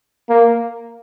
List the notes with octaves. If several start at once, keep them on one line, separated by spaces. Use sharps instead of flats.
A#3